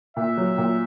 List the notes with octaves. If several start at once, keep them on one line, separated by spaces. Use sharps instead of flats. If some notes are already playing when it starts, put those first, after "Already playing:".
A#2 E5
F#3
A#2